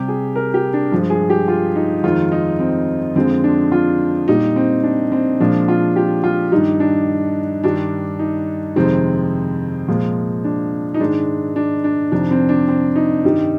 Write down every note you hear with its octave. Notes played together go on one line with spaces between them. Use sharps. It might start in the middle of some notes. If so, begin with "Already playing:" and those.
Already playing: C3 G3 G4
G#4
A#4
G4
D4
G2 F3 G#3
G#4
G4
F4
D#4
F2 D#3 G#3 F4
D#4
C4
F2 D3 F3 G#3 C4
D4
F4
A#2 G3 D#4
C4
D4
C4
A#2 F3 G#3 D4
F4
G4
F4
G2 D#3 G3 D#4
D4
G2 D#3 G3 D4
D#4
F2 C3 D#3 G#3 C4
A#2 F3 G#3
D4
D#4
G#2 D#3 G#3 D4
D4
D4
F2 C3 D#3 D4
C4
D4
C4
D#4
G2 D#3 G3